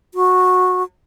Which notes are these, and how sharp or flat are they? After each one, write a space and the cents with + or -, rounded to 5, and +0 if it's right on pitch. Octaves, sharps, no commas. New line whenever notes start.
F#4 -15